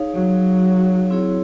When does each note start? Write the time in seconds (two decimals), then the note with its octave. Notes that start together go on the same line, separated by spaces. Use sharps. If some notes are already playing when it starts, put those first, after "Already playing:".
Already playing: D#4 G#4 C#5 F5
0.14 F#3
1.10 C4 E4 G#4 C#5